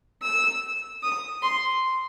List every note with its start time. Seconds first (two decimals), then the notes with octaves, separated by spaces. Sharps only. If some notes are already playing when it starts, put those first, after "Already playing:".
0.22 E6
1.03 D#6
1.42 C6